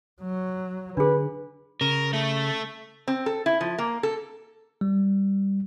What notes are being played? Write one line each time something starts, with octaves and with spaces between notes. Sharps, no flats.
F#3
D3 D4 G#4 B4
C#3 A#4
A3 A4
C4
A4
E4
F3
A#3
A4
G3